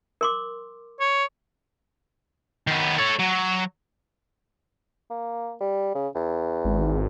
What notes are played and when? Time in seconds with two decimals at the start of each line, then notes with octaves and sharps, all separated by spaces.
0.21 A#4 C6 D6
1.00 C#5
2.67 D#3 B3
2.98 A4 C#5
3.19 F#3
5.10 A#3
5.60 G3
5.95 C#3
6.15 E2
6.65 G#1